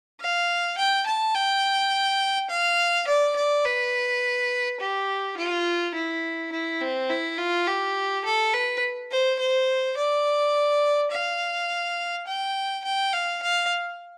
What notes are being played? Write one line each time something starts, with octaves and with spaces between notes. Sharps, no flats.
F5
G5
A5
G5
F5
D5
D5
B4
G4
F4
E4
E4
C4
E4
F4
G4
A4
B4
C5
C5
D5
F5
G5
G5
F5
F5